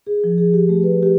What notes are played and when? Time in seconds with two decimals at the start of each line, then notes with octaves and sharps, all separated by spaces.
0.07 G#4
0.24 F3
0.38 G#4
0.54 G4
0.69 A3
0.83 B4
1.03 G4